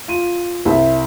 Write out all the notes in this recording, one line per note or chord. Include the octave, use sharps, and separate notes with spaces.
F4 D#7
C2 E5